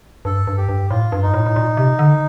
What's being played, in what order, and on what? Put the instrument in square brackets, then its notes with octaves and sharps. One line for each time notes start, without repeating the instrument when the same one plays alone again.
[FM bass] G2 [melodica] A4
[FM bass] G2
[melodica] G4
[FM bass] G2
[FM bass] A2 [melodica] F4
[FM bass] G2
[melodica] D#4
[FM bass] A2
A2
A#2
C3
D3